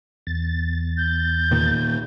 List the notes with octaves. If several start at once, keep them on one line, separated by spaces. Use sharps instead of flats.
E2 A6
G6
A#2 D#3 A#3